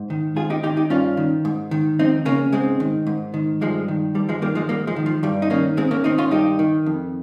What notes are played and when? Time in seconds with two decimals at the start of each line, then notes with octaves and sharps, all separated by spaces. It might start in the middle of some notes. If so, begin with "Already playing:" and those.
Already playing: G#2
0.10 D#3
0.36 G#2 F4 G#4
0.50 D#4 G4
0.63 D#3 D#4 G4
0.77 D#4 G4
0.90 G2 C#4 F4
1.17 D#3
1.45 G#2
1.71 D#3
1.99 F2 C4 D#4
2.25 C#3 A#3 C#4
2.53 G#2 G#3 C4
2.80 D#3
3.07 G#2
3.34 D#3
3.61 G2 F3 G#3
3.88 D#3
4.15 G2 G3
4.29 F3 G#3
4.42 D#3 G3 A#3
4.55 F3 G#3
4.69 G#2 G3 A#3
4.87 F3 G#3
4.96 D#3
5.06 F3
5.23 G2 G3
5.42 D#4
5.50 D#3 A#3 C#4
5.77 G#2 G#3 C4
5.91 A#3 C#4
6.04 D#3 C4 D#4
6.18 C#4 F4
6.31 G2 D#4 G4
6.59 D#3
6.86 F2